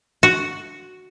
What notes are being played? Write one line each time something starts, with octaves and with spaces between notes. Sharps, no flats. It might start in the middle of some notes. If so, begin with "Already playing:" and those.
F#4